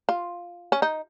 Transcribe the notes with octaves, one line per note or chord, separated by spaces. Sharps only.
F4
C#4
D#4